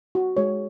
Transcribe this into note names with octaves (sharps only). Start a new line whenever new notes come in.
F#4
G#3 C#5